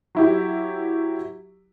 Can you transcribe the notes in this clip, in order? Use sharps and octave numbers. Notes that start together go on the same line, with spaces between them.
F#3 E4 G4